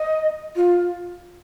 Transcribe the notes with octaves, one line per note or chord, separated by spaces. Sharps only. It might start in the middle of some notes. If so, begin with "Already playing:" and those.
Already playing: D#5
F4